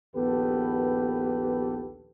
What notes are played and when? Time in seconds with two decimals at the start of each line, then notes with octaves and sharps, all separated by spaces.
0.16 A#1 D#2 B3 G4 A4 B4